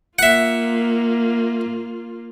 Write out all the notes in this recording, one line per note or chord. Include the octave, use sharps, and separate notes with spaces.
A#3 F4 E5 F#5